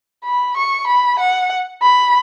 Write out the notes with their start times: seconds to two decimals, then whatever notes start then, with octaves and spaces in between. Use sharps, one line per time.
0.25 B5
0.57 C#6
0.88 B5
1.19 F#5
1.82 B5